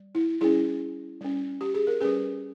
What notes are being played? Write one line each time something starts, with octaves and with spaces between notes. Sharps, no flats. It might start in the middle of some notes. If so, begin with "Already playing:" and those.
Already playing: G3
E4
G3 C#4 E4 G#4
G3 C#4
G4
G#4
A#4
G3 C#4 G#4 B4